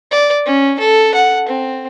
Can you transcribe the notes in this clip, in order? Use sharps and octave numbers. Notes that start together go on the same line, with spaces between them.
D5
C#4
A4
F#5
C4